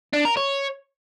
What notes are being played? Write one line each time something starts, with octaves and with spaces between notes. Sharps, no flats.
D4
A#4
C#5